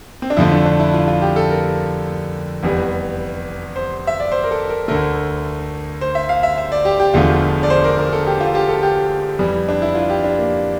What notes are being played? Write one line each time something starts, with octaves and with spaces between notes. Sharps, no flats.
C4
D4
F2 D3 F3 A3 E4
D4
D4
E4
F4
F4
G4
A4
A#4
F1 E2 E3 G3
C5
E5
D5
C5
A#4
A4
A#4
D2 D3 A3 A#4
C5
E5
F5
E5
E5
D5
G4
G4
E1 E2 D3 F3 A3 F4
D5
C5
A#4
A#4
A4
G4
F4
G4
A4
G4
F2 E3 G3
D4
E4
F4
G4
D4
A#3